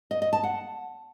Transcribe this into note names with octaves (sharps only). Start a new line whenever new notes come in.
D#5
D#5
A5
F#5